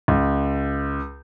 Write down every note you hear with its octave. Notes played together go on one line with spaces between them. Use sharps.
C#2